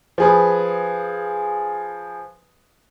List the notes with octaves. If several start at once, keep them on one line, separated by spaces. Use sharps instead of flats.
F3 G#4 B4